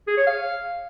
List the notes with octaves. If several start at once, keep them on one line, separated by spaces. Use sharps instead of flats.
G#4
C#5
F5